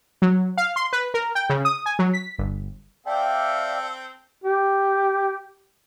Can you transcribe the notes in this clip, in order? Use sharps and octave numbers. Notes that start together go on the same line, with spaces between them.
F#3
F5
C6
B4
A#4
G5
C#3
D#6
G#5
F#3
B6
G1
C4 A4 D5 E5 F5 G5
G4